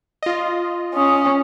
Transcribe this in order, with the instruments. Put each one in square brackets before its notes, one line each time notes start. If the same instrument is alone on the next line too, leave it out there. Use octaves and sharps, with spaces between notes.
[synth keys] F4 D#5
[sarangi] C#4 [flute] D#6